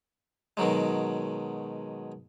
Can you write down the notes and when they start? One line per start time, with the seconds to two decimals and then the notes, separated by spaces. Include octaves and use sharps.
0.57 B2 D#3 F#3 G#3